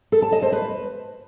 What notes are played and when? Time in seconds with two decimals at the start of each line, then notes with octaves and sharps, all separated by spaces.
0.12 A4
0.22 A5
0.32 D#5
0.42 C5
0.52 B4